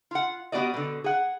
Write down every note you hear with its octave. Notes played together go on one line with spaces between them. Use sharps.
F4 F#5
G3 B3 F#4 D5 D#5
B2 D3
G#4 F#5